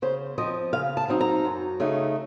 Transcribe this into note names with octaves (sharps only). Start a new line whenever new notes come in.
C#3 C5
F3 C4 D#5
C#3 F5
A5
F#3 C4 D#4
A#5
F#2
C#3 A3 D#4